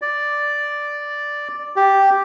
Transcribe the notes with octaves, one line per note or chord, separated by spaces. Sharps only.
D5
G4